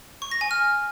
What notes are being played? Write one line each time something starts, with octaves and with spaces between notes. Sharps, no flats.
C#6
A#6
G#5
F6